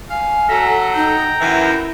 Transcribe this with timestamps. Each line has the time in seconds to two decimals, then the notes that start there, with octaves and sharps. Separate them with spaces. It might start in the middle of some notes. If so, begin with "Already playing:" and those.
0.10 F5 G#5
0.49 F#3 A4 E5 A#5
0.95 D#4 G5
1.41 F#2 E3 E4